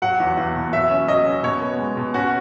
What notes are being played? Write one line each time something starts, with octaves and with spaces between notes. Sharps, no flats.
F#3 F#5
E2
E2
B2
F#3 E5
C#4
F#3 D#5
C#4
B2 C#5
B3
G#3
B2
C#4 F#4